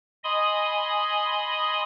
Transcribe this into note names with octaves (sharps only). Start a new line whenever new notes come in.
D#5 G#5 B5 C6 D#6